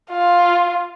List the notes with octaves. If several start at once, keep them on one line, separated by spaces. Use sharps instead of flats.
F4